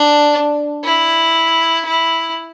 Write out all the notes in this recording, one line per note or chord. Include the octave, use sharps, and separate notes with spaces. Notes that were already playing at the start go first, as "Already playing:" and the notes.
Already playing: D4
E4
E4